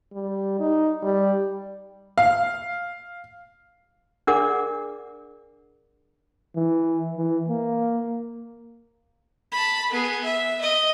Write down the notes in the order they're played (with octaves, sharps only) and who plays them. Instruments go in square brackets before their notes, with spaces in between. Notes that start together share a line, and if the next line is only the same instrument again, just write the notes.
[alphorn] G3
D#4
G3
[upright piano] F5
[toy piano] D4 G#4 A#4 D5 F#5 D6
[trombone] E3
E3
A#3
[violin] A5 B5
B3 G#4
E5
D#5